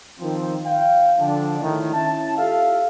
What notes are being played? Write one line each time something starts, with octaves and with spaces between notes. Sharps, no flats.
D#3 F3 C4
F5 G5
D3 F3 D4
A2 D#3
C#4 E4 E5 A5
F4 G4 A4 E5 F5